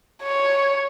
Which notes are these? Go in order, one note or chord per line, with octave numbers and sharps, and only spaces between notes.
C#5